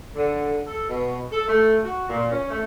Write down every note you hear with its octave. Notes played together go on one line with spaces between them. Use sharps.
D3
A4
B2
A4
A3
F#4
A#2
C#4
A3